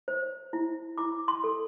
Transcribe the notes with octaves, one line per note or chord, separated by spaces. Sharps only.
C5
E4
E4 D6
C6
A4